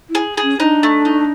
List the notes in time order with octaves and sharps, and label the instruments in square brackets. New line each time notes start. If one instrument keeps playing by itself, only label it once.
[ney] E4
[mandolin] G#4
G#4
[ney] C#4
[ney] D4 [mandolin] D#4
[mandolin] A3
D#4